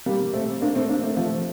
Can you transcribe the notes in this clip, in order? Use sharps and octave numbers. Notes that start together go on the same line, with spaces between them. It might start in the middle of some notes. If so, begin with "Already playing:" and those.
G3 A#3
A3 C4
A#3 D4
A3 C4
A#3 D4
A3 C4
F3 A3